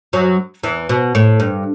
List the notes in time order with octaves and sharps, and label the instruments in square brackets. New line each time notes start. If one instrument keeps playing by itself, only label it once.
[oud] F#2 F#3
E2 E3
B2
A2
G2